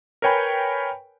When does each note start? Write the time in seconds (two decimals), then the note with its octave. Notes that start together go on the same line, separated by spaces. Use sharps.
0.22 A#4 B4 C#5 G5 G#5 B5